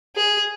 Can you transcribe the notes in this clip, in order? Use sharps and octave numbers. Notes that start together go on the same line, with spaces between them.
G#4